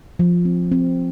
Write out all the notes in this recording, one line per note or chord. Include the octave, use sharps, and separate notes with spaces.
F3
C4
C4